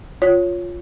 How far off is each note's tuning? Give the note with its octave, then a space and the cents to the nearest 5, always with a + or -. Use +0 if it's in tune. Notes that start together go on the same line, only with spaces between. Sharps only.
F4 +5 C#5 +0